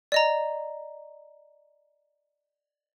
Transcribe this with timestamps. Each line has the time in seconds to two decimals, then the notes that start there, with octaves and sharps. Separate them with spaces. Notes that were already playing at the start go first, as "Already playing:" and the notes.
0.12 D5 D#5 A#5